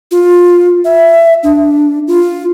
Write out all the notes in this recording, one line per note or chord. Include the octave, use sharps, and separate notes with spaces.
F4
E5
D4
F4